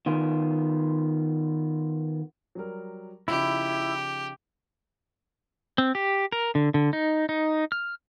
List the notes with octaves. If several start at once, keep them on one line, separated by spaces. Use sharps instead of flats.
D#3 B3 F4
F#3 G3 A#4
C#3 F3 D#4 E4 G4
C4
G4
A#4
D3
D3
D#4
D#4
F6